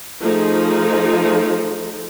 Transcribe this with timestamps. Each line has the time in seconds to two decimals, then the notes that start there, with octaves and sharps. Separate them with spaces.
0.22 F3 A3 D#4 G#4